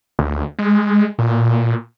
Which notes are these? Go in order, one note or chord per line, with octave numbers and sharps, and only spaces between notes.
D2
G#3
A#2